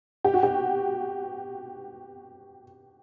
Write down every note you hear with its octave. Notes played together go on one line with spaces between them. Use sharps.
G4
F#4
G4